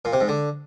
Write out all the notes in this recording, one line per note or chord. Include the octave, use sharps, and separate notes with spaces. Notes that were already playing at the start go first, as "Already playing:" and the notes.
A#2
C3
G#2
D3